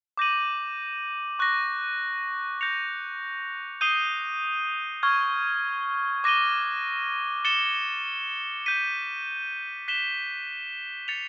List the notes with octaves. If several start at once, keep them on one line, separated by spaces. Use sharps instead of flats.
D6 G6 A#6 D#7 F#7
C#6 F#6 A#6
G6 A#6 C#7 F7
D#6 G6 C7 D#7 G7
C#6 F6 G#6
D6 F#6 A#6 D#7 G7
A6 C#7 E7 G7
G6 B6 D#7
F#6 B6 E7 G7
A6 C#7 F7